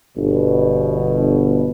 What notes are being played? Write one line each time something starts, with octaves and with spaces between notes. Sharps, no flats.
G1 B2